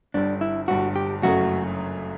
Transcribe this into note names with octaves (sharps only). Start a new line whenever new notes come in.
G1 G2 D3 G3 D4
E4
G1 G2 D3 G3 F#4
G4
F#1 F#2 C#3 F#3 A3 F#4